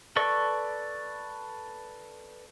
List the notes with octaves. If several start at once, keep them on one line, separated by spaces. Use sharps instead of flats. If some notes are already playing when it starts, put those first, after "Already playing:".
A4 B4 D5 C#6